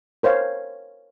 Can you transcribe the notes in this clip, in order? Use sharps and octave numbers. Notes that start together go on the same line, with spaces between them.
A#4 C5 C#5 F5